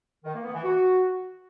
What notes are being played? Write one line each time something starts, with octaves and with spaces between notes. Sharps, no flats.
D#3
A#3
B3
E3
F#4